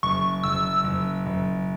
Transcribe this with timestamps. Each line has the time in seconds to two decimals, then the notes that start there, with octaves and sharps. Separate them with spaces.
0.03 F#1 C#6
0.44 F#1 E6
0.84 F#1
1.26 F#1